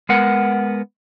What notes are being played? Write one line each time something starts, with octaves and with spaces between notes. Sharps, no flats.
G#3 B3 A#4 F#5